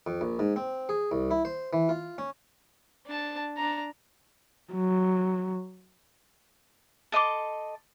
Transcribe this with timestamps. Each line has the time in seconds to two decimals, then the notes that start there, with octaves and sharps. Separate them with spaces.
0.07 F2
0.21 A#1
0.39 G#2
0.56 C4
0.89 G#4
1.12 C2
1.31 E4
1.45 C5
1.73 E3
1.89 F4
2.18 C#4
3.07 D4 A5
3.57 D4 A#5
4.73 F#3
7.12 A4 D#5 C6 D6